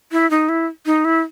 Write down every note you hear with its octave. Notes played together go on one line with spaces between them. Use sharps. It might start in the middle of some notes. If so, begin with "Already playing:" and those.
E4
D#4
E4
D#4
E4